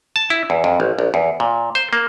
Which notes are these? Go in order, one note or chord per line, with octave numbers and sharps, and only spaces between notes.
A5
E4
E2
F2
A1
A#1
E2
A#2
C5
A#3